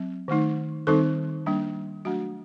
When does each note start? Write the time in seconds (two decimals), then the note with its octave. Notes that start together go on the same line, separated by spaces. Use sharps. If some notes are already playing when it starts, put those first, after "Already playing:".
Already playing: F#3 C4
0.28 D#3 A3 D#4
0.87 D#3 G3 C4 D#4 A4
1.46 G3 A#3 D4
2.05 F#3 A3 D4 F#4